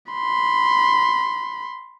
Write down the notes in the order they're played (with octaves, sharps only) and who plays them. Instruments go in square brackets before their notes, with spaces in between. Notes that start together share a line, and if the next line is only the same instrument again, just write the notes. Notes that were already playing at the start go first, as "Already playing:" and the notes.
[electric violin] B5 C6